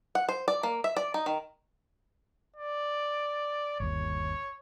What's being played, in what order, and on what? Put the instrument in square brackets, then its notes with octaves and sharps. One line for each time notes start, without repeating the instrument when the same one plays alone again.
[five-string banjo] F#5
C5
D5
A#3
E5
D5
D#4
D#3
[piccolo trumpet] D5
[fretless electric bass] G1 D#2 [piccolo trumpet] C#5